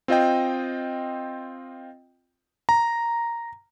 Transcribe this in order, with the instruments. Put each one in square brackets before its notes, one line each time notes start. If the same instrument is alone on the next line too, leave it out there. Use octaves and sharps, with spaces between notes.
[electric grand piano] C4 F4 D#5 G5
A#5